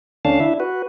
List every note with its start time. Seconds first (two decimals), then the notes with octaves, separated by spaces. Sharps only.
0.25 D2 D3 C#4 D4 F5 A5
0.40 D4 E4 E5
0.60 F#4 B4